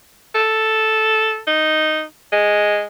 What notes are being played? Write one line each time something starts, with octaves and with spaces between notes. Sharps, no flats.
A4
D#4
G#3